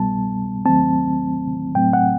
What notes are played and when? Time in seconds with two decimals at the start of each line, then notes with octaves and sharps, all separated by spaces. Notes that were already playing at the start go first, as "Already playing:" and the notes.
Already playing: C2 B2 G3 B3 A5
0.65 D#2 D#3 F#3 A3 C4 A5
1.75 A2 F#3 A3 C4 G5
1.93 F#5